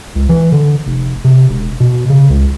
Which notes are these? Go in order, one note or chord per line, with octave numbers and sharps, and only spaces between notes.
C#2
E3
D3
F1
C3
E1
B2
C#3
C#2